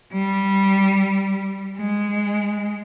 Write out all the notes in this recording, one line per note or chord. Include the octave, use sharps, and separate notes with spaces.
G3
G#3